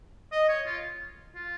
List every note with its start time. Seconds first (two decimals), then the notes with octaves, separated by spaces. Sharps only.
0.32 D#5
0.49 C#5
0.66 F4
1.36 F4